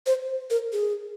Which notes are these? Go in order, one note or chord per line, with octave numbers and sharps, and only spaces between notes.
C5
A#4
G#4